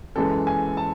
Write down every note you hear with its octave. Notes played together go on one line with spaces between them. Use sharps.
F#2 E3 G#3 A4
G#5
A5